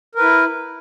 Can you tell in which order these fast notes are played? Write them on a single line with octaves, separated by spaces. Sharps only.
A#4 B4 E4